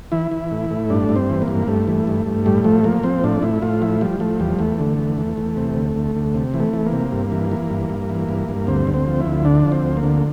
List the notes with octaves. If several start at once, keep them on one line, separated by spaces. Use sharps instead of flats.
E3 E4
E3
A2
A2
G2 D4
G2
C4
E3
A#3
G2
G2 A3
E3
G2
G2
A2 G3
F3 A3
F3 A#3
F3 C4
A2 D4
A2 E4
A2 F4
F3 E4
F3 G3
F3 A3
E2 G3
E2 A3
D3
E2
E2
E2
C3
D2
D2
D2
C3
E3
A3
E3
A#3
C3
G2
E3
E3
G2
G2
E3
G2
G2
D2 C4
D2
C4
F3
E4
D2
D3 D4
F3
C4
D2
A#3
D3